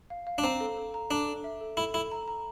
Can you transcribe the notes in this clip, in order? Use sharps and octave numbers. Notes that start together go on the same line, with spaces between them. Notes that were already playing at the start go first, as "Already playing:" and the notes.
F5
F5
D4
C4 A#5
A4
A4
A#5
D4 A4
A4
E5
A4
E4 A4
E4 A4
A#5
A#5